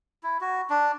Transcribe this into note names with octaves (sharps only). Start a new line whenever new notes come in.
E4
F#4
D4